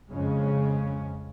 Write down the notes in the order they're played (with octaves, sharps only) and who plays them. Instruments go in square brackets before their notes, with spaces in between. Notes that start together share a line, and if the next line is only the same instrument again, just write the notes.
[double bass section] F2 C#3 G#3 C#4